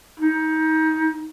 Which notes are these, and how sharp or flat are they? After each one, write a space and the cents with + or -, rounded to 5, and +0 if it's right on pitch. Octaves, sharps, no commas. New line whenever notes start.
D#4 +25